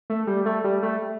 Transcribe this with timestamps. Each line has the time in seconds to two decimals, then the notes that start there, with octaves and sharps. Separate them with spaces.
0.10 A3
0.27 G3
0.46 A3
0.64 G3
0.83 A3